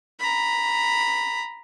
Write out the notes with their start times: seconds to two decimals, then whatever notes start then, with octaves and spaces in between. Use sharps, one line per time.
0.20 A#5 B5